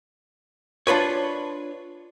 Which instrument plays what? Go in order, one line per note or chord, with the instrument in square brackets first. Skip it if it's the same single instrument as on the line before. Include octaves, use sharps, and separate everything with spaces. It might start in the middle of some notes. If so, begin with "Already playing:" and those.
[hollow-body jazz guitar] D4 F4 B4 C#5